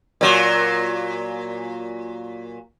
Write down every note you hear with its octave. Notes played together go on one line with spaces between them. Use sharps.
A#2 F#3